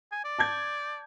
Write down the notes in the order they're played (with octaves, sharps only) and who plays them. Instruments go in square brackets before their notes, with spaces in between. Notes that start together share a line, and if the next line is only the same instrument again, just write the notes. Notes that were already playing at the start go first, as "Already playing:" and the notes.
[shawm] G#5
D5
[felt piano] A5 G6 G#6